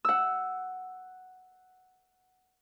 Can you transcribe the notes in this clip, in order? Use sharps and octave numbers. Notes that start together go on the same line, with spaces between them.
F#5 E6